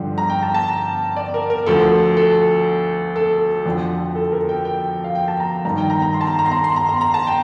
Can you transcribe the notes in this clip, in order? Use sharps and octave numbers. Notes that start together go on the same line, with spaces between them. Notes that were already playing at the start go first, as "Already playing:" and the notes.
Already playing: G2 D3 F3 G5
A#5
G5
A5
A5
D5
A#4
A#4
D2 D3 F3 A4
A4
A4
F2 D3 F3
A4
A#4
G5
G5
F5
G5
A5
A#5
G2 D#3 A#5
G5
A#5
A#5
C6
A5
A#5
A#5
C6
A#5
C6
A#5
C6
A#5
A5
G5